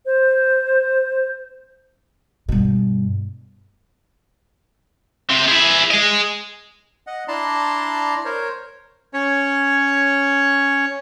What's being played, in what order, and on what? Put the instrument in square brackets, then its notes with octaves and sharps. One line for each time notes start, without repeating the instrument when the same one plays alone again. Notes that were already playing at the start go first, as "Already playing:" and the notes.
[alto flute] C5
[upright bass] G2 B2
[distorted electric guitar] C3 C4
E4 G#4
G#4 D#5
[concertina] D#5 F#5
D4 E4 D5 A5 A#5 C6
A#4 C5 C#5
C#4 C#5